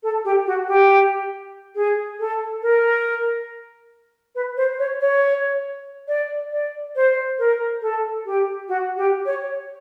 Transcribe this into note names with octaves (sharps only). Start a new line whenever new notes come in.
A4
G4
F#4
G4
G#4
A4
A#4
B4
C5
C#5
C#5
D5
D5
C5
A#4
A4
G4
F#4
G4
C#5